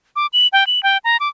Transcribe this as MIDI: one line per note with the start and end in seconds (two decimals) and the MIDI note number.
0.16 0.27 86
0.33 0.47 102
0.53 0.67 79
0.67 0.82 102
0.83 0.98 79
1.04 1.17 82
1.20 1.29 86